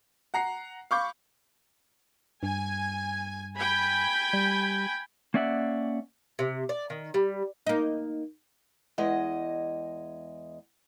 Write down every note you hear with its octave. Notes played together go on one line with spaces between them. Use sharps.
F#5 A#5 C7
F5 B5 C#6 D6 G6
G2 G#5
G5 G#5 B5
G3
A#3 C#4 D5 E5 F#5
C3
D5
D#3
G3
A#3 D#4
E2 G#3 D#5